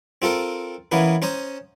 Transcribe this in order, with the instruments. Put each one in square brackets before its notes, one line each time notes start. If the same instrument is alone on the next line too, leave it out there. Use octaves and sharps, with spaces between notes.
[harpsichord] C4 F4 A4 A#4
E3 A#3 B3 C#4
C#4 C5 A#5 D#6